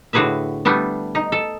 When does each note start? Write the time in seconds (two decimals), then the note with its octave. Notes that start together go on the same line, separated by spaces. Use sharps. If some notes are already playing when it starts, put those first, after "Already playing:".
0.13 A2 D3 F#4 G#4 B4 E5
0.65 G3 A3 B3 D4
1.15 D#4
1.32 A4